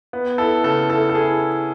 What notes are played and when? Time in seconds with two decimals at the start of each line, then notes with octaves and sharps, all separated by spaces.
0.13 B3
0.38 E4 A4
0.64 C#3 A4
0.90 E4 A4
1.09 A4
1.15 E4 G#4